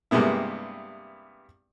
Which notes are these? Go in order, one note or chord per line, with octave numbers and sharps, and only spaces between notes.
G2 C3 G#3 A#3 B3 E4